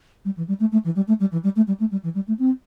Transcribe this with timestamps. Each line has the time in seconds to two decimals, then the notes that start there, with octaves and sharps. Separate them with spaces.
0.25 G3
0.37 E3
0.48 G3
0.60 A3
0.72 A3
0.84 E3
0.96 G3
1.07 A3
1.20 G3
1.32 E3
1.43 G3
1.56 A3
1.67 G3
1.80 A3
1.91 G3
2.03 E3
2.15 G3
2.28 A3
2.39 C4